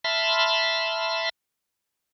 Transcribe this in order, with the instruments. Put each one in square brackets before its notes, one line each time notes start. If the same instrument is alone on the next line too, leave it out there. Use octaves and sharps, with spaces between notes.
[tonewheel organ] E5 A5 B5 C6 F6